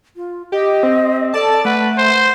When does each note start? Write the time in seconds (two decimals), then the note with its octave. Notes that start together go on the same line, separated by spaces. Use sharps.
0.16 F4
0.52 G4 D#5
0.83 C4
1.34 A4 D5 A5
1.65 A3 B4 F#5
1.98 C5